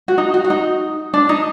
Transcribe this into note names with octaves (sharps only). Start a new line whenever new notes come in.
F#4
D#4
F#4
F#4
D#4
D4
D#4